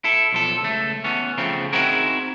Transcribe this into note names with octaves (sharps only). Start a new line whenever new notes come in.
E4 A4
B1 F3 A4
C#2 A3
E3 B3 C#4
C#3 F3 A3 C4
C4 D#4 E4 F#4 G#4 A#4